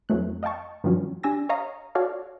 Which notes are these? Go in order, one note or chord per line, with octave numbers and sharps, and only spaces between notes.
F2 E3 F#3 A3 F#6
D#5 F5 G5 A5 C#6
G2 D#3 F3 F#3 C#4
D4 G4 G#5 E6 A#6
C#5 D#5 F5 A#5 D#6
F#4 A4 C#5 D5 F5